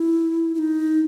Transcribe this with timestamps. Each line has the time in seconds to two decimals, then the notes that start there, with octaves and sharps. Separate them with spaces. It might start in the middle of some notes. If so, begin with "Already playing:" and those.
Already playing: E4
0.55 E4
0.58 D#4